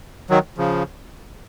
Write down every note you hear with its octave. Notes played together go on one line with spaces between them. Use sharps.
D#3 F#3
C#3 F3